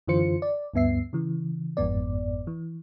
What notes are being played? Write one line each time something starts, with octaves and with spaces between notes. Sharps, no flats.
F#2 D3 E3 F4 C5 C#7
D5
D2 G2 B3 E5 C7
C#3 E3
G1 F2 G#2 B3 D5
E3